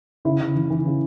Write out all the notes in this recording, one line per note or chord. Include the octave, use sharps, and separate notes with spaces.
C#3 E4
C#3
E3
E3
C#3